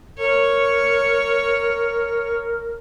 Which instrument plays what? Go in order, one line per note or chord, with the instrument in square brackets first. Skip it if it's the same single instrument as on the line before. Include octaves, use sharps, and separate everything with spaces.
[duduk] A#4 [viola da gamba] C#5